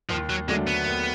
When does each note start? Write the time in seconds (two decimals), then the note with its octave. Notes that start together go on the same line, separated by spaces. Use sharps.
0.10 D#2 F3
0.30 F#3
0.48 D3 F#3 G#3 A3 D4
0.67 B3
0.86 D#2